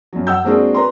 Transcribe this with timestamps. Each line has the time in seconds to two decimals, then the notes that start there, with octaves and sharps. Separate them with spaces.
0.13 F#2 F#3
0.27 F#5 E6 G6
0.44 G#3 A#3 C4 D4 F#4 G#4
0.74 B4 A#5 C6